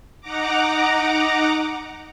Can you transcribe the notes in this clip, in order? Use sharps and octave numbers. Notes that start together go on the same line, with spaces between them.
D#4 F#5 A#5 D6